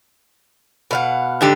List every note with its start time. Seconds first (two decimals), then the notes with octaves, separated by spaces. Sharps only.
0.91 B2 F5 F#5
1.41 G#2 D3 G4